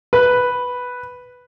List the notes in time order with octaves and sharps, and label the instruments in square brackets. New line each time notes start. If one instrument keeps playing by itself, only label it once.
[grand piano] B4